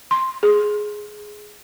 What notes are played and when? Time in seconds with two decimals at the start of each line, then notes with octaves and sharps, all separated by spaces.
0.11 C6
0.43 G#4